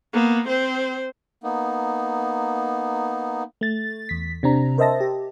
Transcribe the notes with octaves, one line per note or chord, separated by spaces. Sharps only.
A#3 B3
C4 C5
A#3 B3 D#4
A3 A6
E2 B6
C3 C4 D4 A#5
A#4 C5 D#5 E5 A5 A#6
G4